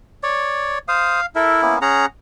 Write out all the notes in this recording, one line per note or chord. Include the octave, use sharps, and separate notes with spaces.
C#5 D5
C5 F5 D#6
E4 A4 A#4 E5
A#3 B3 C#4
C#4 G#4 F#5 A#5